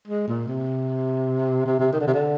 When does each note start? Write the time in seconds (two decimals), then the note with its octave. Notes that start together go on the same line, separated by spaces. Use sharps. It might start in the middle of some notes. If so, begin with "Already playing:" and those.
0.08 G#3
0.28 A#2
0.48 C3
1.66 C3
1.79 C3
1.92 D#3
2.00 D3
2.07 C3
2.14 D3